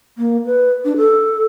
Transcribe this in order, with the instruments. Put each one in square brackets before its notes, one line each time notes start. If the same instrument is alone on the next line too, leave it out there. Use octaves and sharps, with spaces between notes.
[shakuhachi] A#3
B4
D4
A4